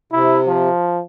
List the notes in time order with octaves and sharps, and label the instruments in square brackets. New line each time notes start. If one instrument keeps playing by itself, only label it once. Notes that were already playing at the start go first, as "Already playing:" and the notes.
[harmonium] C3 [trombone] E4
[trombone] F3